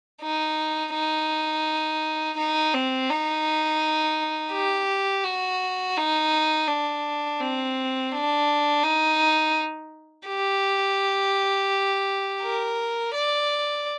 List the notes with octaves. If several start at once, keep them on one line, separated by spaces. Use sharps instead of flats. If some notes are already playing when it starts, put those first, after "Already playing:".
D#4
D#4
D#4
C4
D#4
G4
F#4
D#4
D4
C4
D4
D#4
G4
A#4
D5